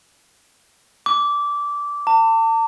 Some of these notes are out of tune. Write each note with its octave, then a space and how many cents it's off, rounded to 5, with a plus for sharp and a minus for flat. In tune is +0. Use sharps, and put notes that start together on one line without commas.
D6 -15
A5 +40